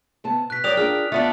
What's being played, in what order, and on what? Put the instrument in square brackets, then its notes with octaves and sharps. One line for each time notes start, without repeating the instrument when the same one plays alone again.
[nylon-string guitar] C3 B3 A5
[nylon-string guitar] B2 [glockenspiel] F#6 B6
[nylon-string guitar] F#3 C#5 [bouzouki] A#4 D5 G5 [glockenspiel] D#6 F7
[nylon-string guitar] D4 F4 G#4 [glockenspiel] F6
[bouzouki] A3 B3 D4 [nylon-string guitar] F4